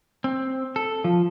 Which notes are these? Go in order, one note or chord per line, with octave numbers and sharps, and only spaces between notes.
C4
A4
F3